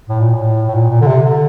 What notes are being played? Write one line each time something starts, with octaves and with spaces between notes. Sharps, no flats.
A2
A#2
A2
A2
A#2
A#2
D3
C3
D3